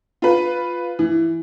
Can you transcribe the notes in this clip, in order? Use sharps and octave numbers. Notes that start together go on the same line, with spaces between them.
F4 B4
E3